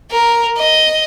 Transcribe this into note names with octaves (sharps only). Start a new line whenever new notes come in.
A#4
D#5